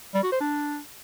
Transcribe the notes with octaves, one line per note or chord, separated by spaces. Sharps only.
G3
F#4
C5
D4